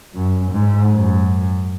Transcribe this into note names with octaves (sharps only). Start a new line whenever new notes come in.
F#2
G#2
F#2